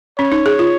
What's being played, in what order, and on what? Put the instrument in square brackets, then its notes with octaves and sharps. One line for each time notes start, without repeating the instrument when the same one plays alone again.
[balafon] C#4 [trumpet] C#5
[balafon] D#4
G#4
F4